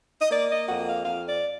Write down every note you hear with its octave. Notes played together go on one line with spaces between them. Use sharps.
D#5
A#3 D5
D#5
F2 F#5
F5
F2 F5
D5